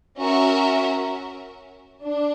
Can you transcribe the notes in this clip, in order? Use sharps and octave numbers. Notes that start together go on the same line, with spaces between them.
C#4 F#4 A#4 E5
D4